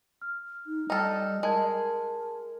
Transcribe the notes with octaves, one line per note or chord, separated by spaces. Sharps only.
F6
D#4
G3 D#4 A4 D#5 G5 F6
G#3 A#4 A5 G#6